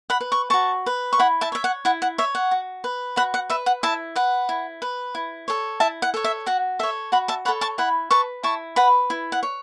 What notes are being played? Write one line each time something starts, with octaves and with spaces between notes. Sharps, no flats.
F#5 B5
B4
C#6
F#4 A5 C#6
B4
C#6
E4 F#5 B5
E5 A5
C#5 E5
F#5
E4 F#5
F#5
C#5 E5
F#5
F#4
B4
F#4 F#5 B5
F#5
B4 E5
F#5
E4 E5 A5
B4 F#5
E4
B4
E4
A4 C#5
E4 E5 A5
F#5
A4 C#5
E5
F#4 F#5
A4 C#5 E5
F#4 F#5 B5
E5 A5
A4 C#5 F#5 B5
A5 C#6
E4 F#5 B5
B4 A5 C#6
E4 A5 C#6
B4 F#5 B5
E4
F#5
C#5